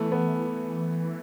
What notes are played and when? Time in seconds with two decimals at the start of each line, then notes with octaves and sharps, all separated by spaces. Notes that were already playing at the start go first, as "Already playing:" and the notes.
Already playing: E3 A3 B3
0.12 B3